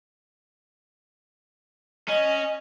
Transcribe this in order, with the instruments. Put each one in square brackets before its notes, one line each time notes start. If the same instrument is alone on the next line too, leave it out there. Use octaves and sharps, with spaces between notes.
[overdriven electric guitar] C#4 [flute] D#5